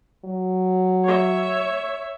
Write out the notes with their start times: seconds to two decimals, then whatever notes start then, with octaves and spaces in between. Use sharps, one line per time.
0.25 F#3
1.04 C#5 E5